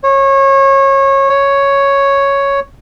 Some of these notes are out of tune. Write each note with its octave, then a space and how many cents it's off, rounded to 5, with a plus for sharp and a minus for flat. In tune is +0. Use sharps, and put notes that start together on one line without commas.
C#5 -25
C#5 +0